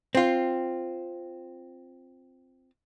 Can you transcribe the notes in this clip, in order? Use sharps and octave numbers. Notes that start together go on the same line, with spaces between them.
C4 F4